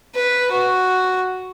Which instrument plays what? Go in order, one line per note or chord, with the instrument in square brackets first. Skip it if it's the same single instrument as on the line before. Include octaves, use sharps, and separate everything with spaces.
[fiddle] B4
F#4